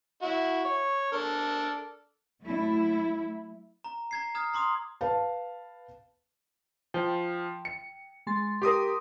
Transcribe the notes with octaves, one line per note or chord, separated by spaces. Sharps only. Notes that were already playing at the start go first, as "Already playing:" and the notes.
E4 F#4
C#5
D4 A4 A#4
F#3 A3 E4
A#5
A#5 G#6 C7
A#5 D#6 F6 G#6
A#5 C6 D6 D#6 F7
B4 F5 A5
F3 G5
C#7
G#3 C6 A6
G4 A#4 C6 D6 D#6